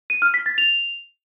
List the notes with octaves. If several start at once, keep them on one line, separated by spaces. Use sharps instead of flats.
D#7
F6
B6
A6
F7